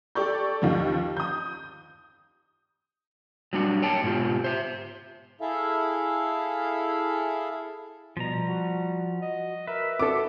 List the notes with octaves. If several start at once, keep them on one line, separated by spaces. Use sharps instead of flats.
G4 A4 D5 C#6 G6
D#2 D#3 F3
D#6 G6
F#3 G3 D4 F#4
C#5 G5 A5
G#2 B2 B3 F4 G4
C5 E5
E4 G#4 A4 E5 F5
B2 F3 G3 A#5
F#4
D#5
A#4 B4 E5
F#4 A4 D6